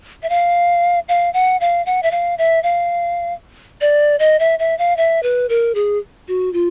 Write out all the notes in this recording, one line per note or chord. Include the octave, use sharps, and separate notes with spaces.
E5
F5
F5
F#5
F5
F#5
E5
F5
E5
F5
D5
D#5
E5
E5
F5
E5
B4
A#4
G#4
F#4
F4